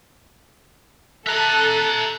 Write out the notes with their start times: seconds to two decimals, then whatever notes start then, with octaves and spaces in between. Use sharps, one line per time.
1.27 A4 E5 A#5 F#6